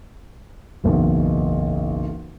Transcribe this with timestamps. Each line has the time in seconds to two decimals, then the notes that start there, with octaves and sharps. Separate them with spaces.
0.84 F#1 B1 E2